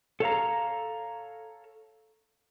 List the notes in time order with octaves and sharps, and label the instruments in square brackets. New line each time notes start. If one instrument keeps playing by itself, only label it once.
[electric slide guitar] A4 C#5 F5 A#5